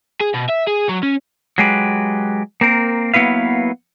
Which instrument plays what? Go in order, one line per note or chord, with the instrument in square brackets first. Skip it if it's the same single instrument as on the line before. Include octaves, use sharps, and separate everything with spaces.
[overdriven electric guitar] G#4
B2
E5
G#4
F#3
C#4
[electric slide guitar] F#3 G#3 G4 B4
A#3 C4 A#4
F#3 A#3 B3 E4 B4 F5